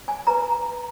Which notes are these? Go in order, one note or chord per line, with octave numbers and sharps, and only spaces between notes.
G#5
B4 A#5